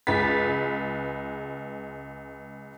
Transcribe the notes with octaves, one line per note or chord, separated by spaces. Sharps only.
C#2 G#3 B4 A6 B6